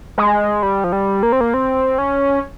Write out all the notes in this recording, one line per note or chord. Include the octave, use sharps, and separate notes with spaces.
G#3
G3
F3
G3
A#3
C4
A#3
C4
C#4